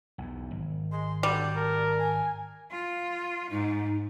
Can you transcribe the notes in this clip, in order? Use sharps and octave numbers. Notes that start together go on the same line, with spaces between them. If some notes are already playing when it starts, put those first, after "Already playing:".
B1 E2
G#1
G#3 C6
D3 G3 F#4
A#4 A5
G#5
F4
G#2 D#4